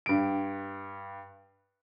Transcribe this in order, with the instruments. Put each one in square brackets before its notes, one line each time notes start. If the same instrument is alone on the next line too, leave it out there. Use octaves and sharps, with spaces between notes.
[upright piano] G2 D7